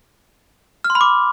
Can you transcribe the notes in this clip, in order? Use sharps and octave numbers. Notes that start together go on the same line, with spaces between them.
F6
C6
B5
D6